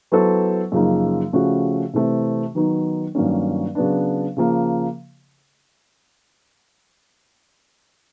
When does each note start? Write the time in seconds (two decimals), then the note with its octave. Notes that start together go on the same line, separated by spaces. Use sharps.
0.12 F#3 B3 E4 A4 C5
0.72 F#2 C#3 F3 A#3 D#4
1.33 C#3 F3 A3 C#4 F#4
1.93 C3 E3 A3 C4
2.55 D#3 F#3 B3 D#4
3.15 G2 D#3 F#3 A#3 C#4
3.75 C#3 F#3 B3 D4
4.37 C#3 F3 A#3